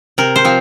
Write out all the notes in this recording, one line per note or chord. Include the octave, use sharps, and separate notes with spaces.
C3 A#4
C5
F3 C4